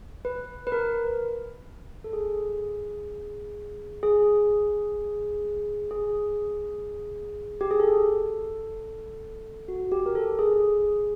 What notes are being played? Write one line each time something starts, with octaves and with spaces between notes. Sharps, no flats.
B4
B4
A#4
A4
G#4
G#4
G#4
G4
G#4
A4
F#4
G4
A#4
A4
G#4